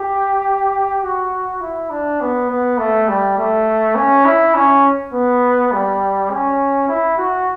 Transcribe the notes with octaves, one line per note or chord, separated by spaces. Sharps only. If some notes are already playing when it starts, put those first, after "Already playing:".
Already playing: G4
F#4
E4
D4
B3
B3
A3
G3
A3
C#4
E4
C#4
B3
G3
C#4
E4
F#4